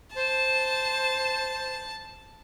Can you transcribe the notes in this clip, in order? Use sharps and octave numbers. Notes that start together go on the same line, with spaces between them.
C5 A5